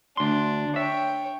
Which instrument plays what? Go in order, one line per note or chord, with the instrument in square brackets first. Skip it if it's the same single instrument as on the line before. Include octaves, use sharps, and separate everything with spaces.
[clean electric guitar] D2 C6 [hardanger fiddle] D4
[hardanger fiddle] C#5 G5 [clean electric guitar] E5